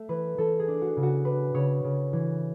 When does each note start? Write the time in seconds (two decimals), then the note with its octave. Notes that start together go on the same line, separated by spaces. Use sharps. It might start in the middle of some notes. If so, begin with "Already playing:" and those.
Already playing: A3 E5
0.09 E3 B4
0.38 E3 A4
0.59 G#4
0.68 D4
0.82 F#4
0.97 C#3
1.03 F#4
1.25 D4 B4
1.54 C#3 C#5
1.84 C#3
2.13 E3